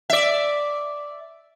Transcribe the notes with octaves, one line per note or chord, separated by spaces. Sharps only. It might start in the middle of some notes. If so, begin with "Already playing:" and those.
D5 E5